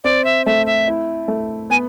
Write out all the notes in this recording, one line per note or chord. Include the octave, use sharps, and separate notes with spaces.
C4 D5
E5
A3 E5
E5
E4
A3
B3 G#5